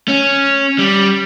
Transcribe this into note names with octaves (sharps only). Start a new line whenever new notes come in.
C#4
G3